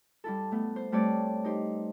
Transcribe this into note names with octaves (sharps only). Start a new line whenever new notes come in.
G3 E4 A4
A3 B3
C5
G3 A3 C4 C#5 D5
D#4 G4 C5